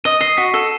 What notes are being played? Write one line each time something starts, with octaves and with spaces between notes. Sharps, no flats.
D#5 D#7
D#5 C7
F#4 B6
A4